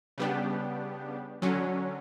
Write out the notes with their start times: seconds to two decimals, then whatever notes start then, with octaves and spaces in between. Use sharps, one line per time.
0.18 C#3 G3 B3 D4 G4
1.42 D3 F#3 C#4